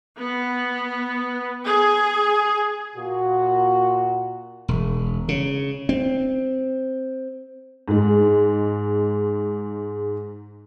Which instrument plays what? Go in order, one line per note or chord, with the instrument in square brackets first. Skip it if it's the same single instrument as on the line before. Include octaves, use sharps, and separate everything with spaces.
[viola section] B3
G#4
[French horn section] A#2 F#4
[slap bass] E1
C#3
C4
[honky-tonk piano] G#2 G#3